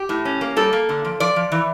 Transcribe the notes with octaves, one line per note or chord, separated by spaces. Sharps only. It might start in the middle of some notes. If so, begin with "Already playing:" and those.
Already playing: G4
A2
C#4
A#3
G3 A4
A#3
D3
F3
F3 D5
F3
E3